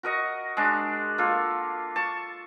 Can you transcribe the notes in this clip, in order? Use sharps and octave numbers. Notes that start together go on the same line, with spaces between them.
F#4 A#4 D#5 C#6
G#3 D4
A#3 F4 A4
A5 C#6